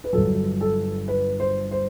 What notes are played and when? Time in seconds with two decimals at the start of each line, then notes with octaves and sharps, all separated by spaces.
0.04 B4
0.13 G1 G2 F#3 A4
0.61 A4
1.08 B4
1.40 C5
1.71 C5